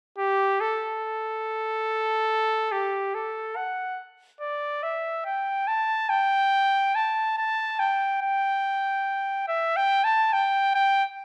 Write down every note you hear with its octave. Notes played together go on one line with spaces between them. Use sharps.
G4
A4
G4
A4
F#5
D5
E5
G5
A5
G5
A5
A5
G5
G5
E5
G5
A5
G5
G5